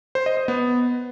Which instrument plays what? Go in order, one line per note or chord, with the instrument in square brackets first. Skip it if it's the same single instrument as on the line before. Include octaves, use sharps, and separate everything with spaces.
[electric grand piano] C5
D#5
D#5
B3